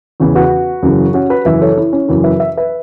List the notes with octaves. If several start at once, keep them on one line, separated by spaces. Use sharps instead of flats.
E2 C#3 E3
F#4 B4
F#2 C#3 E3
C#4 F#4
F#4 B4
F#2 C#3 E3 B4 E5
A4 C#5
E4
C#4
F#2 C#3 E3 E4
B4 E5
E5
B4 E5